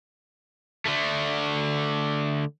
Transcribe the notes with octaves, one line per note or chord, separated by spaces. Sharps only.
D3 A3